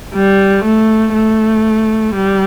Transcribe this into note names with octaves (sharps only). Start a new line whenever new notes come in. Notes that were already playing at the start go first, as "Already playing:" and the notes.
G3
A3
A3
G3